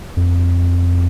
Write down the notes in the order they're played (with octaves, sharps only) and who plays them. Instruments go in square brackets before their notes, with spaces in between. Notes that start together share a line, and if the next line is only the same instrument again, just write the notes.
[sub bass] F2